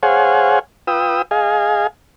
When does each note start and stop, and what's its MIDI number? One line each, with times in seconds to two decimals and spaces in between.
0.03 0.59 68
0.03 0.59 72
0.03 0.59 73
0.03 0.59 77
0.03 0.59 78
0.03 0.59 80
0.87 1.22 65
0.87 1.22 71
0.87 1.22 79
0.87 1.22 87
0.87 1.22 88
1.31 1.87 68
1.31 1.87 75
1.31 1.87 77
1.31 1.87 80